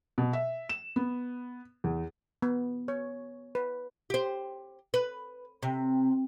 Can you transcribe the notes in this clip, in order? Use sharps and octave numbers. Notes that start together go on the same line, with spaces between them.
B2
E5
E7
B3
E2
B3
C#5
B4
G4 C5
B4
C3